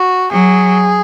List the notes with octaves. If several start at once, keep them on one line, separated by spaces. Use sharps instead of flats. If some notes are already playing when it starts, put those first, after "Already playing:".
Already playing: F#4
F#3 G#4